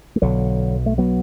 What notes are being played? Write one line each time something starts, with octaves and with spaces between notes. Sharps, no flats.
A3
B1 B2 D3 F#3
A3
F#3 B3